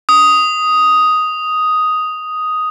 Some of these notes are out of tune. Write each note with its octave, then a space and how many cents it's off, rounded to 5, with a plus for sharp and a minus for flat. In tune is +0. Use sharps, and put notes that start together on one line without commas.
D#6 +5